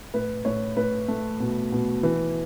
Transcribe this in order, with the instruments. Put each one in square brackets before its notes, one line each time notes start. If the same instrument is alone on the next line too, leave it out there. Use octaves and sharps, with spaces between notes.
[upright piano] A2 B4
A2 C#5
A2 B4
A3
B2
B2
E3